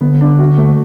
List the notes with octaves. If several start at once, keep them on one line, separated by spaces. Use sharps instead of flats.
D3 B3
D4
F#4
A3